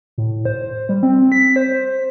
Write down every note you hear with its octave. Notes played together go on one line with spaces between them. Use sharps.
A2
C5
G3
C4
B6
C5